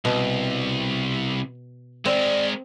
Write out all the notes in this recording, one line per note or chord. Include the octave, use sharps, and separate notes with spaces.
C2 B2
G#3 C4 A#4 D5